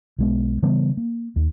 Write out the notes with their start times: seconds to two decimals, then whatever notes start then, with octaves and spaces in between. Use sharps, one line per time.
0.19 B1 G#3 B3
0.62 C#3 E3 G3 B3
0.97 A#3
1.36 D#2